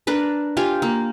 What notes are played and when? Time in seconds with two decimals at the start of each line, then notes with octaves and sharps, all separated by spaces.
0.07 D4 A#4 B4
0.57 F4 G4 F5 G#5
0.82 A#3